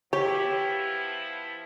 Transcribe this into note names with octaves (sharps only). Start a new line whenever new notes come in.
F3 B3 E4 G4 C#5